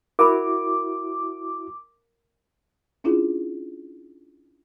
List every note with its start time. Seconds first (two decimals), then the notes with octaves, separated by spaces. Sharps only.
0.19 E4 F#4 A#4 B5 D6
3.04 C#4 D4 E4 F4 G#4